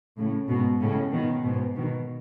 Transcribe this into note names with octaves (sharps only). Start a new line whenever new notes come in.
A2 C#3
G#2 B2
A2 C#3
B2 D#3
G#2 B2
B2 D#3